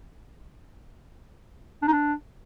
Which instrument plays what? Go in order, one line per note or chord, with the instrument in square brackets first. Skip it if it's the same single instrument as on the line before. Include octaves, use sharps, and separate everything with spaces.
[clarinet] D4
D#4
D4